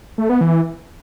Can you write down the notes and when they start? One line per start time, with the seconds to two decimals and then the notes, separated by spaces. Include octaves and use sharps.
0.18 A3
0.29 B3
0.41 E3